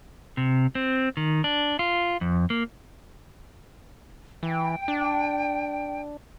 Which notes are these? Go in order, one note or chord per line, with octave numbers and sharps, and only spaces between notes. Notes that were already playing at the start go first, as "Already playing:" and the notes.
C3
C4
D#3
D4
F4
F2
A#3
E3 G5
D4